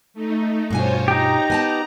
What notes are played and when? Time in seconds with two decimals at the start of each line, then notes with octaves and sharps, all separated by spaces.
0.14 A3 D#4
0.71 G2 B2 F4 C5 C#5 G#5
1.08 D#4 G4 A#5
1.50 B3 G#5 A5